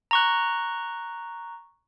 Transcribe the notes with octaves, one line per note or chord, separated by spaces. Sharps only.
A#5 C#6 F#6